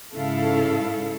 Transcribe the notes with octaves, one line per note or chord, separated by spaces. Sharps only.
G#2 C#3 E4 A4 F5